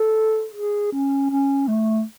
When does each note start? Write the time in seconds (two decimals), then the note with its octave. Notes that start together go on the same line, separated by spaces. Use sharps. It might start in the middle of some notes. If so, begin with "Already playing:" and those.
Already playing: A4
0.53 G#4
0.92 C#4
1.30 C#4
1.68 A3